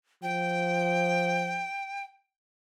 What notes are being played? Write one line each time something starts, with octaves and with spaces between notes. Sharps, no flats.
F3 G5